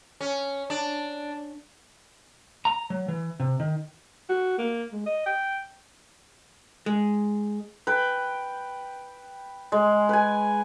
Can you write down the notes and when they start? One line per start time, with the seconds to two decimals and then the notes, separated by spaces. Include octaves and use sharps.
0.21 C#4
0.70 D4
2.65 A#5
2.90 F#3
3.08 E3
3.40 C3
3.60 D#3
4.30 F#4
4.59 A#3
4.92 G#3
5.06 D#5
5.26 G5
6.86 G#3
7.87 B4 G5
9.72 G#3
10.09 B4 G#5